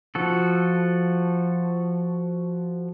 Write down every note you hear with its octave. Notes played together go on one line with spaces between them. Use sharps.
F3 F#4 A4